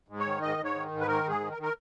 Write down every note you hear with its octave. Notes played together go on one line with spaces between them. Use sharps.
G#2
C#5
D#3
G#2 D#5
G#2
C#5
D#3
G#2
B4
D#3 A#4
G#2 G#4
D#3
A#4
D#3
A#4